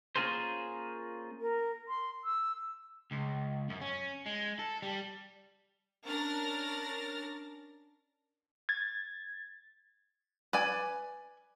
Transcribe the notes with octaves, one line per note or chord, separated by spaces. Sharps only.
A#3 C#4 F4 G#4 A#4 C5
A#4
C6
E6
C#2
F#2
C#4
G#3
A4
G3
C#4 D4 A#4 F6 A6 A#6
G#6 A6
B4 D5 G#5